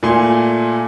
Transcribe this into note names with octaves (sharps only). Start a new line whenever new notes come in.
A#2 A3 G#5 C6